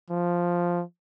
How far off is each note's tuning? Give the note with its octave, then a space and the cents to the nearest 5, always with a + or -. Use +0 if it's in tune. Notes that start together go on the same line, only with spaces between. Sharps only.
F3 +0